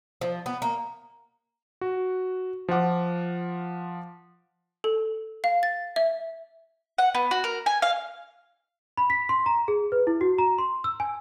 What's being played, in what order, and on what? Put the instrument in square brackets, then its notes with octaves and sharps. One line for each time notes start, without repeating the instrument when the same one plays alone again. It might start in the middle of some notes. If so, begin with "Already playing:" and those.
[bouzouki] F3
B3
A#3
[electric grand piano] F#4
F3 F4 F#5 D6
[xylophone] A4
F5
A6
E5
[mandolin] F#5
B3
F#4
A#4
G#5
F5
[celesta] B5
B6
C6
A#5
G#4
B4
E4
F#4
A#5
C6
E6
G#5